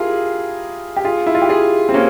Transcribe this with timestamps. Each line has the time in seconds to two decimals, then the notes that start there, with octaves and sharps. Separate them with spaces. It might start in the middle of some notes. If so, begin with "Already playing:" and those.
Already playing: E4 F4 G4 G#4 A#4
0.96 G4
1.04 F4 G#4
1.26 E4
1.35 F4
1.42 G4
1.49 F4 G#4
1.89 C4
1.94 A#3 C#4